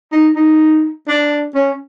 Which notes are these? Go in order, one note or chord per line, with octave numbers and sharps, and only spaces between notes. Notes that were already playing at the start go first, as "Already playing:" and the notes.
D#4
D#4
D4
C#4